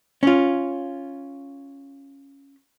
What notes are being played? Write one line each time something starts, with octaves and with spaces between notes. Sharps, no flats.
C#4 F4